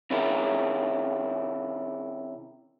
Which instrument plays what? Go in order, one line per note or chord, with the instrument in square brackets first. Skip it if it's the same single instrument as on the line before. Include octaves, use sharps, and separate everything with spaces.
[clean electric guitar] C3 D#3 C#4 E4 G#4 A#4